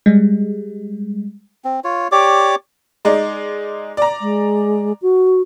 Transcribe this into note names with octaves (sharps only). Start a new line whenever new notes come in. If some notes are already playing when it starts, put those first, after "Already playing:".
G3 G#3
C4
F4 C#5
G4 C#5 D5 D6
G#3 D#4 D5
D5 A#5
G#3
F#4